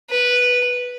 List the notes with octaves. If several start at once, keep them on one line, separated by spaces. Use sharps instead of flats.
B4